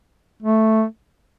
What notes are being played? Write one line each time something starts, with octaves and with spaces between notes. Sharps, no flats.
A3